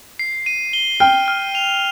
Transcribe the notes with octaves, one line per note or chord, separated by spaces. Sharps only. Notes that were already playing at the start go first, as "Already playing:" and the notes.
C7
D#7
G7
G5 F6
F6
F7